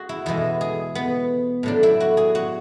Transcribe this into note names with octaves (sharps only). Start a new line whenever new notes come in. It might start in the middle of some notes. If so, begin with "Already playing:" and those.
Already playing: F#4 G#4
E4
E2 B2 G#3 E4
G#4
B3
A2 F#3 A3 D4
E4
F#4
G#4
F#4